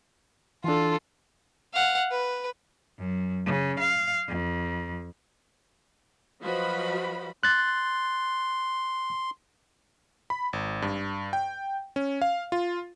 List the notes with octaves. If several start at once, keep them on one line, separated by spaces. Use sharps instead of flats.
E3 D4 F4 A4
F5 F#5
B4
F#2
C#3
F5
F2
F3 F#3 F#4 B4 D#5 B5
C6 F#6 A6
B5
G#1
G2
G5
C#4
F5
F4